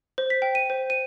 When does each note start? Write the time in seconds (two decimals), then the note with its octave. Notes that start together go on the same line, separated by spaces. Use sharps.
0.18 C5
0.30 B6
0.42 G5
0.55 D#7
0.70 C5
0.90 D#7